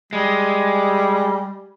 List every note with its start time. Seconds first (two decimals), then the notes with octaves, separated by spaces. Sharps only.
0.13 G3 G#3